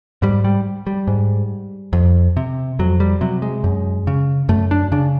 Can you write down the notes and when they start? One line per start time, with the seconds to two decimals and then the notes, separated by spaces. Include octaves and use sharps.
0.22 G#2 G3
0.44 G3
0.87 G3
1.07 G#2
1.93 F2
2.37 C3
2.79 F2 F#3
3.00 G3
3.21 C3 F#3
3.42 G#3
3.64 F#2
4.07 C#3
4.49 F#2 A3
4.71 D4
4.92 C#3 D4